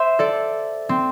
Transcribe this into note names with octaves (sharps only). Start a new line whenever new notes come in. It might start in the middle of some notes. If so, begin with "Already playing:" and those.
Already playing: C5 E5
A4 D5
C4